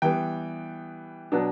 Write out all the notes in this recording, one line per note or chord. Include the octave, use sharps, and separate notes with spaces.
E3 G3 B3 G5
B2 F#3 B3 D4